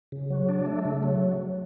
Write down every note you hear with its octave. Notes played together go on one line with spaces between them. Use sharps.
C#3
F#3
D4
A3
C#3
F#3